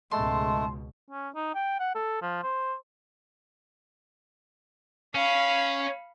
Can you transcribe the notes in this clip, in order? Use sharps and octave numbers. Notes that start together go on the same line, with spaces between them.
C#2 G#2 B2 G#3 A3 A5 C6
C#4
D#4
G5
F#5
A4
F3
C5
C#4 F5 B5